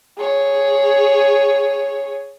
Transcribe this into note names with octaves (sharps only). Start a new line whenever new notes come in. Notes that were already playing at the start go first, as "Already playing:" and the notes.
G#4 C#5